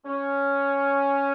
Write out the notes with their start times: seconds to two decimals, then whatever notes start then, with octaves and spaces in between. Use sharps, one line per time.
0.05 C#4